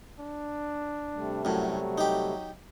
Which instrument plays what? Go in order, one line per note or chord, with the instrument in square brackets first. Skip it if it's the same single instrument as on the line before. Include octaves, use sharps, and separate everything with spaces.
[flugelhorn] D4
[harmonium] C3 G3 A3
[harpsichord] F#2 A2 [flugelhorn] F#3
[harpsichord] D#4 G4